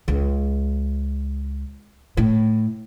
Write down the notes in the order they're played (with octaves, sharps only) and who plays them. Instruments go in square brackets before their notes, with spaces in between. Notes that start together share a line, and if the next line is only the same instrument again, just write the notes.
[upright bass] C#2
A2